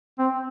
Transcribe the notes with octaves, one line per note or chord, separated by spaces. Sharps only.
C4